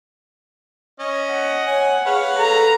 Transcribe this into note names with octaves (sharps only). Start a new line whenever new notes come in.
C#4 D#5
F#5
C#5 G#5
G#4 B4 C#5 F5
A4 A#5